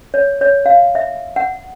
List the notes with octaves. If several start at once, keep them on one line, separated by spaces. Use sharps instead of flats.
C#5
C#5
F5
E5
F#5